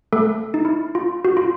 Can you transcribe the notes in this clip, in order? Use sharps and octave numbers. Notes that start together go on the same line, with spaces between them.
A3 A4
D#4
E4
F4
F#4
F4